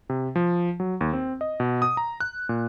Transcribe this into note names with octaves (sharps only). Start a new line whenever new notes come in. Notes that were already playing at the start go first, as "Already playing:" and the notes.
C3
F3
F#3
D#2
C4
D#5
B2
D#6
A#5
F#6
A#2